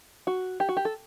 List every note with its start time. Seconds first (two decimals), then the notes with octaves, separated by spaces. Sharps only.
0.27 F#4
0.60 G4
0.69 F#4
0.77 G4
0.85 A4